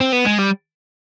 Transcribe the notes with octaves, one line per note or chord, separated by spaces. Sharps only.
C4
B3
G#3
G3